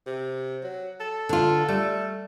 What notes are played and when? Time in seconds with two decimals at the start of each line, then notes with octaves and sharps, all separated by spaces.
0.07 C3
0.63 F#3
1.00 A4
1.29 D3 F4
1.68 G3 A3